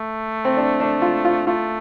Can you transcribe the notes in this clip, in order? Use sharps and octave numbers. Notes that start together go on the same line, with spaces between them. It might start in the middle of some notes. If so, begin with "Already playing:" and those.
Already playing: A3
C4
D4
D4
F4
F4
A3 F4